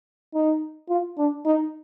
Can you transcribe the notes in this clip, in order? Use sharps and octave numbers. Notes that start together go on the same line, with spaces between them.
D#4
F4
D4
D#4